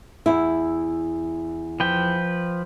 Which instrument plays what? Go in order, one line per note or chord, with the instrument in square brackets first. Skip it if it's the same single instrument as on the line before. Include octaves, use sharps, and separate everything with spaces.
[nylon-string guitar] E2 E4
[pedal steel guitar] F3 B4 G5